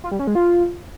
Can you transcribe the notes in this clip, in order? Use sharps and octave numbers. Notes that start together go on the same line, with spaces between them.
F4
G3
C#4
G#3
F4